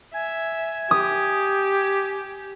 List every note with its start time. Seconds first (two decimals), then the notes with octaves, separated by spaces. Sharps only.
0.14 E5 G#5
0.91 G4 D#6